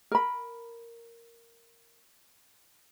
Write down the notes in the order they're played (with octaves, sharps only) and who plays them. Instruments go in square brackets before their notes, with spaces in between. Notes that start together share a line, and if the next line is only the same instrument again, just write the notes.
[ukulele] A#4 B5